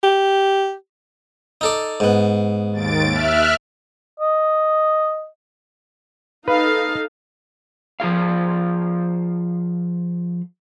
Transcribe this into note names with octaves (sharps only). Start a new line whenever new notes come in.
G4
D#4 A4 D5
G#2 B3
D#2 A6 D7
E5 F6 F#6
D#5
D#4 A4 B4 F5
F3 F4 G#4 F5